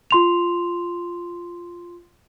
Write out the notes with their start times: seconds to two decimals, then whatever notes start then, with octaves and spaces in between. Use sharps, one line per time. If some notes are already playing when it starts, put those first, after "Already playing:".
0.11 F4 C6 F7